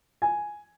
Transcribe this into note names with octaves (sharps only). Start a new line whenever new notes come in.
G#5